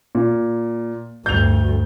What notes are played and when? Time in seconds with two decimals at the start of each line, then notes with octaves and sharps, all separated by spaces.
0.15 A#2
1.26 D2 G2 G6 F7